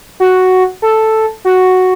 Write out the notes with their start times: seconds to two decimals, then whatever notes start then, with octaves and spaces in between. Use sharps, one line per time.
0.20 F#4
0.82 A4
1.45 F#4